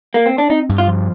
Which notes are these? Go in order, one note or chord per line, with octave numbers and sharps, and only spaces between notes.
A#3
C4
D4
C4 D#4
G2
F4
F3